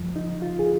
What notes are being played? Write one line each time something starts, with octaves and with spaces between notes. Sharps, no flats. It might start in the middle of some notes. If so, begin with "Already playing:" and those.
Already playing: F#2 F3
D#4
F4
G#4